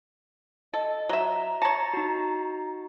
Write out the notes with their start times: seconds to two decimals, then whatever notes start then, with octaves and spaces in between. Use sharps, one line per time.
0.74 A4 D#5
1.09 F#3 E5 A#5
1.62 C#5 A5 A6 A#6 C#7
1.93 D#4 F#4